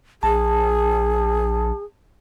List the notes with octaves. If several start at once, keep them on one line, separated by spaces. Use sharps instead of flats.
A#1 G#4 A5